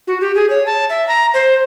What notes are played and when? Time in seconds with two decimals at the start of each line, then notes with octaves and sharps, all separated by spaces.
0.07 F#4
0.21 G4
0.35 G#4
0.50 C#5
0.66 A5
0.89 E5
1.08 A#5
1.34 C5